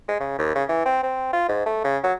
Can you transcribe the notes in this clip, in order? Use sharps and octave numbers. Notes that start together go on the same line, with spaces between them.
G#3
C#3
D#2
C#3
E3
C4
C4
F4
G#2
A3
C#3
F#3